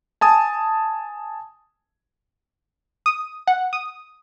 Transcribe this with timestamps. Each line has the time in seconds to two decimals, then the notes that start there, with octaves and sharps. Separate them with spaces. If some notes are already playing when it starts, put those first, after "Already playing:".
0.21 G#5 A5 D#6
3.06 D#6
3.47 F#5
3.73 D#6